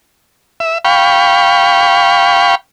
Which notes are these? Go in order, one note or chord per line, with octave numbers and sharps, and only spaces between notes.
E5
F5 G5 B5 C#6